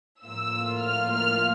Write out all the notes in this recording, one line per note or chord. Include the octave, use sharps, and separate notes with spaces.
A2 F3 A#3 F4 E6
F6
F6